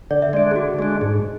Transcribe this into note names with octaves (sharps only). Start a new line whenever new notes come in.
D3 D5
E5
G#3 D4 D5
G#4
D3 F#4
G#3 D4 G#4
G#2 G#4